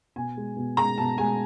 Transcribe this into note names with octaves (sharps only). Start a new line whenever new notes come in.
B2 G#5
G#3
B2
G#3 A#5
B2 A5
G#3 G#5